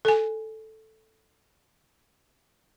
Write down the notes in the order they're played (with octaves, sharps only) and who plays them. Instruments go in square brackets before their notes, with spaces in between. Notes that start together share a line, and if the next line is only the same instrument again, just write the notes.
[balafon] A4 G#5